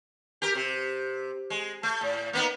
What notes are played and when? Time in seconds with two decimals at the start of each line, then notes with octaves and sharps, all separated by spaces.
0.42 G4 A#4
0.55 C3
1.50 G#3
1.83 A3
2.01 A2
2.33 A#3 B3 D#4